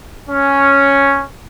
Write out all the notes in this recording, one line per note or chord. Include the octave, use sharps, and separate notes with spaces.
C#4